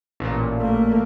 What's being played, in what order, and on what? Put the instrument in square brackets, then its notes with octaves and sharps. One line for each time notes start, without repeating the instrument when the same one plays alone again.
[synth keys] A1 A#2
[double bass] A3 A#3